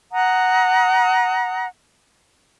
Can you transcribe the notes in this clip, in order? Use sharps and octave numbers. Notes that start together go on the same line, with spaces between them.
F#5 A#5 D#6